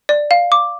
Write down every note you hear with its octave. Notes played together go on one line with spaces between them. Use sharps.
D5
F5
D6